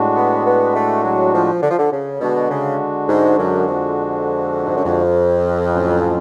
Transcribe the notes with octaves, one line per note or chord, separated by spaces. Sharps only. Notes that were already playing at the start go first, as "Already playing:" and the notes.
Already playing: A2 G#3 D4 F#4
B3
B3
A3
F#3
F3
D3
F3
D3
C#3
B2 D3 G#3 D4 F#4
C#3
G#2
F#2
F2
G#2
F#2
F2
A2 F#3 C#4 F4